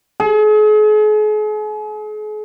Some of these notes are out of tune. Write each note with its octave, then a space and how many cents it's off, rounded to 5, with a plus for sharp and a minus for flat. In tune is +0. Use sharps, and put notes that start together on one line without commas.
G#4 +40